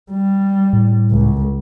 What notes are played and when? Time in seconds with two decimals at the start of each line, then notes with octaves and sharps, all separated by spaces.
0.11 G3
0.73 A2
1.10 C#2